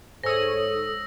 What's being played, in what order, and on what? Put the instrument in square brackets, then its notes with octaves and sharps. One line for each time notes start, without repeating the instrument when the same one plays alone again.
[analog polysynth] G#2 C#5 D#6 [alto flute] A4 [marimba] C5 G#5 [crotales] E6 A#6